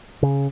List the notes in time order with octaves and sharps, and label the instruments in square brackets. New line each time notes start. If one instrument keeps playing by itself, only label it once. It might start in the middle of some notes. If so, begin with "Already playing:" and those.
[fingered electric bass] C#3